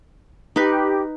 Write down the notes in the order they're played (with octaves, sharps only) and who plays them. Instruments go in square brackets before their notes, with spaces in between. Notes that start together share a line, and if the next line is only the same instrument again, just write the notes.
[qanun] D#4 B4 [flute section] G4